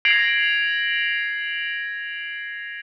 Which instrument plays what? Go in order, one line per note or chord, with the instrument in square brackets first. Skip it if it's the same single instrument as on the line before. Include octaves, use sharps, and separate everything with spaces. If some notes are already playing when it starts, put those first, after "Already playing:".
[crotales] G#6 A#6 C7 D7 F7 F#7